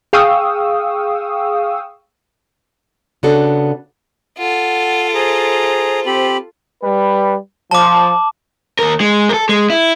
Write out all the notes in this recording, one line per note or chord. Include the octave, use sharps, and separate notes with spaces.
G#4 F5 G5 C#6 D#6 E6
C#3 B3 D4 F#4 A4
F4 A4 F#5
G#4 C5 A#5
C4 G4 B5
G3 B4
F3 A5 D6
D#2 A#4
G#3
A4 A#4
G#3
E4